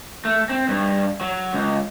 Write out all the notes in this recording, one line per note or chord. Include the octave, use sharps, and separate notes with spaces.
A3
C4
G2
F#3
C#2